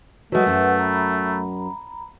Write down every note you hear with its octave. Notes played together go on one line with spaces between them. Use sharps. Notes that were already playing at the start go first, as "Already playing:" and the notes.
F#3 G#3 A3 B4 F#5
F#2
A#5 B5